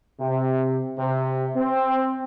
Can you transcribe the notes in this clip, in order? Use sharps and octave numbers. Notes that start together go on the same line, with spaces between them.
C3
C3
C4